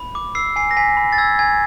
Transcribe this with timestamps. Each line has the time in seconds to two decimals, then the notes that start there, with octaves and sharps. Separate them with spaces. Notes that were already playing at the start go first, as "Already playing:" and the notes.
Already playing: B5
0.15 D6
0.35 E6 C7
0.56 G#5 C7
0.71 A#6
0.77 G#5 B6
0.97 B5
1.12 A6
1.18 E6 G#6
1.39 G#5 G#6